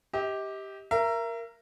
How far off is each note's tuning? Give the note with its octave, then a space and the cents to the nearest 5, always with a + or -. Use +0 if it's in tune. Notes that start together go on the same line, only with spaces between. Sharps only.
G4 +0 D#5 +40
A#4 +0 E5 +35